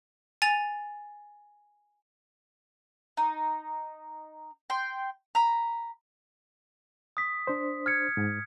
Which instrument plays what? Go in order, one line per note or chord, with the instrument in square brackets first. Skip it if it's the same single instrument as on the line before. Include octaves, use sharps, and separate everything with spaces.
[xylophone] G#5 A6 F7
[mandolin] D#4
G5 C6
A#5 B5
[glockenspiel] D#6 B6
[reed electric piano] D4 C5
[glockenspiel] F6 G#6 C#7
[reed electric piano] G#2